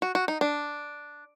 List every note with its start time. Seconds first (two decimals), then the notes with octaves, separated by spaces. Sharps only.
0.02 F#4
0.15 F#4
0.28 D#4
0.41 D4